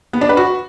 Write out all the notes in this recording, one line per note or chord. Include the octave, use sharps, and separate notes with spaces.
B3
D4
B4
F#4